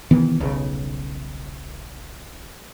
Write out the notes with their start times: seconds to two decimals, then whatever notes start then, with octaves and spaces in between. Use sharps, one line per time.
0.11 C3 D#3 E3 B3
0.38 D#1 B1 C#3